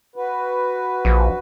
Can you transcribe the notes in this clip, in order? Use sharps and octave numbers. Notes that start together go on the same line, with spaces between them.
F#4 B4
A#1